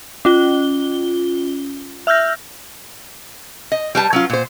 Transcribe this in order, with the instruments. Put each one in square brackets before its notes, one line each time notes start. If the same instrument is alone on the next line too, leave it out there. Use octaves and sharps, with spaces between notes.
[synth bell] C#4 F4 G7
E5 E6 F6 G6 A#6
[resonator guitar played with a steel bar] D#5
G3 B4 A5
F#3 C#4 F4
A#2 C5